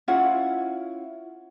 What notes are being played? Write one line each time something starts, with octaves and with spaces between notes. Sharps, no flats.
C#4 E4 F4 F#5